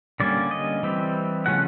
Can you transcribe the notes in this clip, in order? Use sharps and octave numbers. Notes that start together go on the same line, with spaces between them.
D3 G3 A#3 C#4 D5
D#5
E3 G3 C4
C#3 F3 A3 C#4 F#5